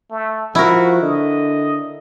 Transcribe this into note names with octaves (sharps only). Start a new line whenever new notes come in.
A3
F3 E4 F#4 A#4
D3 D#5